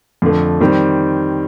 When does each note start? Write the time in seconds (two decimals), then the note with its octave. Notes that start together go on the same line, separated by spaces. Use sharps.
0.22 F2 D3 A3
0.60 D#3 G3 C4